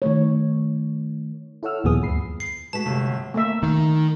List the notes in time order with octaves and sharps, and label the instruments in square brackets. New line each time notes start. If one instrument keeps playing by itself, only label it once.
[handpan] D#3 A3 C#5
[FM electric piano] E4 A4 C#5 F#5 E6 F6
D#2 A#2 F3 B3 G#4 D#6
D2 G2 B5 C7
[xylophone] C7
[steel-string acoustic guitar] G#3 A3 F#4 [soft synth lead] B4 [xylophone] A5 B6
[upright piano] G1 [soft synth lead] C3
[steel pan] A3 A#3 E5
[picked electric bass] D#3